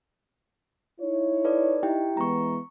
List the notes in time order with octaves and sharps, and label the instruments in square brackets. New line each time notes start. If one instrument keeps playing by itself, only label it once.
[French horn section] D#4 E4 C#5
[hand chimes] A4 B4 D5
[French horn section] D#4 [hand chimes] E4 G4 G5
[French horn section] E3 G#3 B3 [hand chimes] A#5 C#6